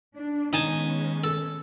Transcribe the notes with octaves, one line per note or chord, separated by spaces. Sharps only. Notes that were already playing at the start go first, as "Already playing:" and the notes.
D4
D#3 G#3 B3 C#4 D#4 G#5 A5
A4